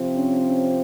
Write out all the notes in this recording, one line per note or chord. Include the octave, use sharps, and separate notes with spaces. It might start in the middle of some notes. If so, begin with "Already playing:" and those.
Already playing: C3 F3 C4
C#4
C#4